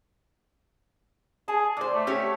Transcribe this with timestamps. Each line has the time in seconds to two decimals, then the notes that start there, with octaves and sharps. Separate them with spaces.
1.48 G#4 A5
1.77 A2 C5 D5
1.95 A3
2.07 C#4 G4 C#5